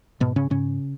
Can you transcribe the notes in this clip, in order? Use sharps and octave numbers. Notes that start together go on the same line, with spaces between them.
G#2 B2 B3
C#3 C#4
G#2 C#3 C#4